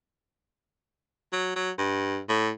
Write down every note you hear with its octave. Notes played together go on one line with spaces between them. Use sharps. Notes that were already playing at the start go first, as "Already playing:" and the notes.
F#3
F#3
G2
A2